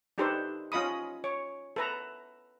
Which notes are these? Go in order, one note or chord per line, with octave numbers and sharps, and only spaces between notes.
D4 D#4 G4 A4 B4 C5
C#4 F4 D#5 B5 D#6
C#5
A4 B4 A#5